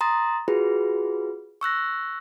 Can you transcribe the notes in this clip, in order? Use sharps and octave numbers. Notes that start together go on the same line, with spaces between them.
A#5 C6 D#6 A6
F4 F#4 G#4 B4
C#6 E6 F#6 A#6